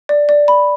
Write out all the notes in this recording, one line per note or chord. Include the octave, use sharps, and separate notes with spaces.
D5
D5
B5